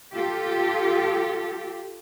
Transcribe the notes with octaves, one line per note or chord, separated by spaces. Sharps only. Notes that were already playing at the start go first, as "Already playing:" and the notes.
F4 G4 A4